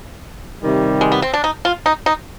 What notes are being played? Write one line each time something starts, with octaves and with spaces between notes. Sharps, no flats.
C3 D#3 G3
G#3
B3
C4
D4
D#4
F4
D#4
D#4